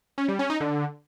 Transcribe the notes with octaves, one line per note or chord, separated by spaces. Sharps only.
C#4
G3
C#4
D#4
D3